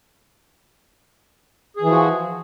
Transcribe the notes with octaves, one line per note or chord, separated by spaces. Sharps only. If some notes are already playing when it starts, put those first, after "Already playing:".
E3 F3 F#4 G#4